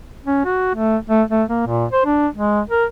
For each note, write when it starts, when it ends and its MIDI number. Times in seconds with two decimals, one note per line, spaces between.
0.26 0.40 61
0.45 0.72 66
0.75 0.97 57
1.10 1.22 57
1.31 1.43 57
1.48 1.62 58
1.67 1.86 46
1.92 2.04 72
2.06 2.27 62
2.34 2.61 56
2.69 2.85 70